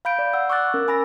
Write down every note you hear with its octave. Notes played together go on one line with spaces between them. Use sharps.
F5 B5 G6 D7
D5
F#5 E6
C#6 D6 E6 F#6 A6
C#4 A#4
G#5 B5 E6 A#6